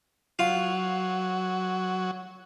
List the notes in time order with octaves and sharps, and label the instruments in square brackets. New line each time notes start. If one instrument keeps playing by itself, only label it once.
[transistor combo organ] F#3 [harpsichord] F4